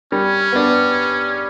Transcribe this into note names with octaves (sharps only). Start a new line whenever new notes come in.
G3 C#4
B3 D4